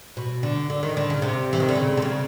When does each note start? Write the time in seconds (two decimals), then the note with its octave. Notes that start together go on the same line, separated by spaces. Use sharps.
0.17 B2
0.43 D3
0.70 D3
0.83 D#3
0.97 D3
1.10 C#3
1.22 C3
1.53 E3
1.60 D#3
1.68 D3
1.75 C#3
1.97 C3
2.02 C#3